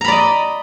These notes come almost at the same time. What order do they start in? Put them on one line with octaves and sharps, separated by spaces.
A#5 B5 D5 D#5